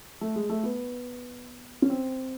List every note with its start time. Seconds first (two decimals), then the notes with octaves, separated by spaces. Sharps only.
0.21 A3
0.36 G#3
0.50 A3
0.63 B3
1.82 C#4
1.90 C4